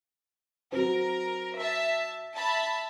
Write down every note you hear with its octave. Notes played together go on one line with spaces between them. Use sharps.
F#3 C4 A#4
E5 A5
E5 A5 B5